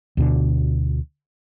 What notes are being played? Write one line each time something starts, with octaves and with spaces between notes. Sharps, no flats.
D2 B2 D3